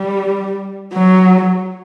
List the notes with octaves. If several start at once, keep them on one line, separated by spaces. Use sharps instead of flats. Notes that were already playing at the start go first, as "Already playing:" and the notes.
Already playing: G3
F#3